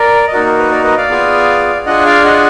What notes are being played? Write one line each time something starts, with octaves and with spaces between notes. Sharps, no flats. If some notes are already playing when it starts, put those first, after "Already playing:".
Already playing: A#4 D5
D#5
A#3 D#4 F#4 A#4 D5
A#4
B4
A#4 D5
B4 D#5
D5 F5
B3 F4 G#4
D4 F4 G#4 D#5 F#5
D5 F5
D#5 F#5